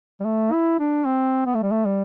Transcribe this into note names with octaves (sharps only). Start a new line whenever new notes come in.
G3
A3
E4
D4
C4
B3
A3
G3
A3
G3